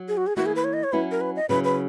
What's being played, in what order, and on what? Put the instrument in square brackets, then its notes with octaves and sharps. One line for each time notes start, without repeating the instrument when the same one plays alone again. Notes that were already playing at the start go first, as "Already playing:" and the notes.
Already playing: [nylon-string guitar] F#3
[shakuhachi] G#4
F#4
G#4
[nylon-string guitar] E3 A#3 E4 [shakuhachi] F#4
[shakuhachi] G#4
B4
C#5
D#5
C#5
[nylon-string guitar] F#3 C#4 E4 [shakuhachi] B4
[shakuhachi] A#4
B4
D#5
[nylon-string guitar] C#3 F#3 C#4 E4 [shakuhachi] B4
[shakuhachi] B4